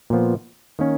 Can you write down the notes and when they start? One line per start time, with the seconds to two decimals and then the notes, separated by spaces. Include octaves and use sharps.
0.10 A#2 F3 B3
0.79 D#3 A#3 C#4